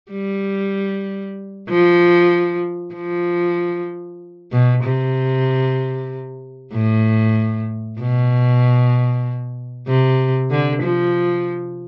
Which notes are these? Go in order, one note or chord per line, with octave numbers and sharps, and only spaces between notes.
G3
F3
F3
B2
C3
A2
B2
C3
D3
F3